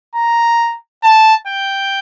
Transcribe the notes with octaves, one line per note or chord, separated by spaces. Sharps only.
A#5
A5
G5